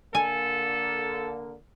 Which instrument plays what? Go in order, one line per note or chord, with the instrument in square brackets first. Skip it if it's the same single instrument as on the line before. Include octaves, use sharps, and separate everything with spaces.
[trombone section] D3 A#3 [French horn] A4 [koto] G#5